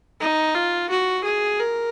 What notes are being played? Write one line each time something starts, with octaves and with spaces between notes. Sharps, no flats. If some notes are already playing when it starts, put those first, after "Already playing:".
D#4
F4
F#4
G#4
A#4